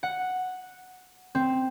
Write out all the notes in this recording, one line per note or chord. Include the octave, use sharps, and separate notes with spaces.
F#5
C4